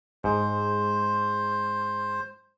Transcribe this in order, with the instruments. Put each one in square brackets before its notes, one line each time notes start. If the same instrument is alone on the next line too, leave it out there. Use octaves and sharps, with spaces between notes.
[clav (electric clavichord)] G#2 [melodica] C5